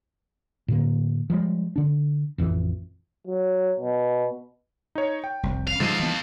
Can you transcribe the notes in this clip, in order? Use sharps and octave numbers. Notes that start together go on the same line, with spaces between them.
A2 D3 A#3
F3 G3 G#3
D3 D4
A1 F2 E3
F#3
B2
D#4 C#5
G5
F1 C2
F5
G#2 C#3 F3 G3 A4 F5 D#7
E3 B3